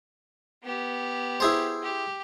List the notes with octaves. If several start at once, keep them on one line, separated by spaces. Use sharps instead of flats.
B3 G4
E4 G#4 C5
G4